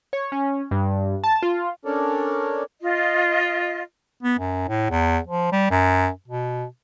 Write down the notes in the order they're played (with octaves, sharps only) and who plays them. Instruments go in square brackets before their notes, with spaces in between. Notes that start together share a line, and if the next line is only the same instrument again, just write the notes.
[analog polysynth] C#5
C#4
G2
A5
F4
[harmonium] C#4 D4 A4 A#4 C#5 D5
[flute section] F4 D#5
[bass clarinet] B3
F#2
A2
E2
F3
G3
F#2
B2